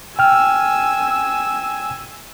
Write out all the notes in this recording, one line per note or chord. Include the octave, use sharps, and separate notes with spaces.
G5 G#5 E6 F6